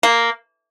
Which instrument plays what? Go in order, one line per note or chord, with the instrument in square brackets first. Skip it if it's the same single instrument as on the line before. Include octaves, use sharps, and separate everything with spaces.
[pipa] A#3